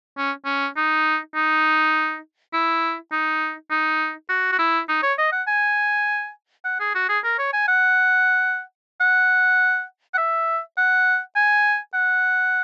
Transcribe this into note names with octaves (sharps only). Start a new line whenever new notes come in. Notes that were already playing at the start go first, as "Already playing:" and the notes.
C#4
C#4
D#4
D#4
E4
D#4
D#4
F#4
F#4
E4
D#4
C#5
D#5
F#5
G#5
F#5
G#4
F#4
G#4
A#4
C#5
G#5
F#5
F#5
F#5
E5
F#5
G#5
F#5